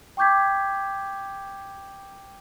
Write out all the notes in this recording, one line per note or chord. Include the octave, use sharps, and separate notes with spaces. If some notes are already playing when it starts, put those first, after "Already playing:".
G5 C#6 D6 G6 G#6 B6